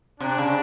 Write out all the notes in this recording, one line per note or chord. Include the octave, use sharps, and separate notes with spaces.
C3 D4
C#3